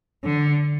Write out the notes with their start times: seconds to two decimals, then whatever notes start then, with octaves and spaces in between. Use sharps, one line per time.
0.24 D3